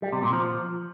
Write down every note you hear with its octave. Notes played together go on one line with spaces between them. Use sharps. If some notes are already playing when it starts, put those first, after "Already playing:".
G3
C3
A#2
F3